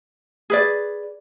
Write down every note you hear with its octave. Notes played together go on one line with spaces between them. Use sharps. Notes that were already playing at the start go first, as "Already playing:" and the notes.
G#4 B4 D5